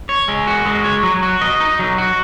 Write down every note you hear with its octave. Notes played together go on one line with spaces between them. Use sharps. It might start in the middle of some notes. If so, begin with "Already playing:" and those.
C#5
G#3
F#4
G#3
C#5
F#3
F#4
D#5
D#4
F#3
F#4